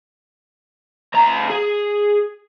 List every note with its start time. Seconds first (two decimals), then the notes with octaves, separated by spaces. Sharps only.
1.14 D2 A#5
1.50 G#4